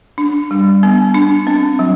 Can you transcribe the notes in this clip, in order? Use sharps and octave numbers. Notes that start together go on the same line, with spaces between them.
D4
G3
B3
D4
C4
F#3